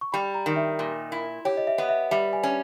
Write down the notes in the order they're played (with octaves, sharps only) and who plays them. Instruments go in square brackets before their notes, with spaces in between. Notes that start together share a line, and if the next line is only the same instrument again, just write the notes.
[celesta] C#6
[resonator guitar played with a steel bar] G3 [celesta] B5
[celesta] A#5
[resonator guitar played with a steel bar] D#3
[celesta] E5
[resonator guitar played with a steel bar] A#2
E4
[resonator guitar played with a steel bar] G4 [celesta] C#5
[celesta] D#5
E5
[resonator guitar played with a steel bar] B3
[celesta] E5
[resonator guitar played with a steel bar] G3 [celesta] E5
[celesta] G#5
[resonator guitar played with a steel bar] C#4